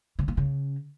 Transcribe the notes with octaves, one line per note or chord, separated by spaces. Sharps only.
C#3
A#2
C#3